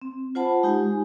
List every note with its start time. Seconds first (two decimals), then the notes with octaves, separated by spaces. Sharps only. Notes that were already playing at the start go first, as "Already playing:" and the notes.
0.02 C4
0.35 F4 C5 F#5 A5 B5
0.63 G#3 D#4 G4 G#5